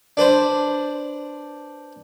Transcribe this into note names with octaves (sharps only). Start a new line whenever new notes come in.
D4 B4 C5